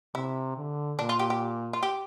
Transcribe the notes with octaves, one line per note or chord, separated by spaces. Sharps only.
C3 E4
D3
A#2 D4
F4
G4
G4
F4
G4